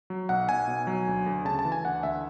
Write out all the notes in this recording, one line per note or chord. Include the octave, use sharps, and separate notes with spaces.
F#3
B1 F#5
B1 G#5
B2
F#3
D2
D2
C#3 A5
A5
E3
G#5
D2 F#5
D2 E5